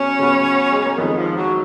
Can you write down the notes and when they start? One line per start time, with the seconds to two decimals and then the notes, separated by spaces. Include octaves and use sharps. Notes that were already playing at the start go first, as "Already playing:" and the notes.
Already playing: C#3 F#3 B3 C#4
0.19 C#3 F#3 B3
0.72 G#3
0.85 A#3
0.98 F2 D#3 G#3 B3
1.18 F3
1.37 F#3